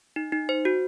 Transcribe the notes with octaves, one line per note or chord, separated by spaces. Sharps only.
D#4
D#4
C5
F#4